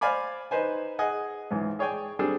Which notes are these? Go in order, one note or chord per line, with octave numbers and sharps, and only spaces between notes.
C5 D5 F5 G#5 B5 D6
D#4 B4 C5 G#5
G#4 D#5 F#5 G#5
C#2 G#2 E3
G#4 C#5 D5 G5 G#5
G3 C4 D4 G#4 A4